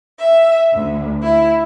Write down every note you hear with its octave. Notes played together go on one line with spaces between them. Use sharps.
E5
D2
E4